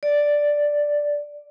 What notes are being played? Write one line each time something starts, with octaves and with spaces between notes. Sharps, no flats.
D5